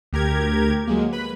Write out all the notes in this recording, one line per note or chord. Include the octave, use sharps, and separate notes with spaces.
D2 G4 A#4 G#6
F#3 G#3 A#3
B4 B5